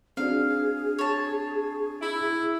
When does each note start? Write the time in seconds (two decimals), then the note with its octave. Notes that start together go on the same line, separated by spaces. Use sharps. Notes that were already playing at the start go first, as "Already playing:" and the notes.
0.17 C4 D4 F#4 G#4 F5
0.99 C#5 A5
2.02 E4